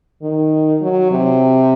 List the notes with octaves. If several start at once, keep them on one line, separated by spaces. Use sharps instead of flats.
D#3
F#3
C3